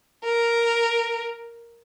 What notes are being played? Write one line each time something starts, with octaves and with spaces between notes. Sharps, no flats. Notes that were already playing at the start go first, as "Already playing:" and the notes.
A#4